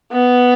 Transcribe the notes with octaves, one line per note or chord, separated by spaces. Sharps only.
B3